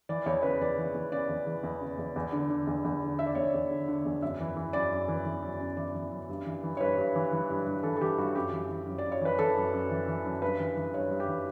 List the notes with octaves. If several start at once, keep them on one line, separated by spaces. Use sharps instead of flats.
E3 D5
E2 C#5
C#3 B4
E2 D5
E3
E2
C#3 D5
E2
E3
E2
C#3
E2
E2
D3
D3
E2
E2
D3
D3 E5
D5
E2 C#5
D5
E2
D3
D3
E2
F#2 E5
E3
E3
F#2 D5
F#2
E3
E3
F#2
F#2
E3 D5
E3
F#2
G2
E3
E3
C#5
G2 B4
G2
E3
E3
G2
G2
E3 A4
A4
E3 G4
G2 F#4
F#2 G4
E3
E3
F#2
D5
F#2
C#5
E3 B4
E3 A4
F#2
F#2
E3
E3
F#2
G2 B4
E3
E3
G2 C#5
G2
G4
E3